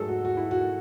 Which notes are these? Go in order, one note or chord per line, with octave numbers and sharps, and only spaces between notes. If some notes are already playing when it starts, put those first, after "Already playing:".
Already playing: G#2 F#3 A3 G#4 A4
F#4
F#4
E4
F#4